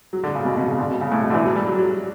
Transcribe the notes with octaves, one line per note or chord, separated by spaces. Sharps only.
F#3
D3
C#3
B2
B2
C#3
D3
B2
C#3
A2
B2
D3
E3
F#3
G3
F#3
F#3